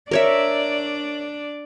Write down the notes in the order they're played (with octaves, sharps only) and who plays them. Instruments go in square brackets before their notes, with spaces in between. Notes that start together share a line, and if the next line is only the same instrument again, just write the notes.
[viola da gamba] D4 D5 [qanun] A#4 C#5 E5